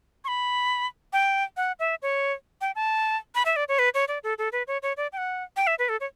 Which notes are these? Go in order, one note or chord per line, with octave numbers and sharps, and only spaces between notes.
C#6
B5
G5
F#5
E5
C#5
G5
A5
B5
E5
D5
C#5
B4
C#5
D5
A4
A4
B4
C#5
C#5
D5
G5
F#5
G5
E5
B4
A4
C#5